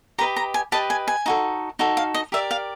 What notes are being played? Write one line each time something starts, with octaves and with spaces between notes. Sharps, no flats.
G4 B4 D#5 A#5
A#5
G#5
G4 B4 D#5 A5
G#5
G#5
D#4 F#4 A4
D#4 F#4 A4
F5
D#5
G4 A#4 D5 E5
F5